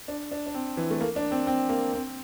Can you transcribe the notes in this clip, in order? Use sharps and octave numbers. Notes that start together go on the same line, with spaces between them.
D4
D4
D4
C4
E3
A3
A#3
D4
C4
C4
A#3
C4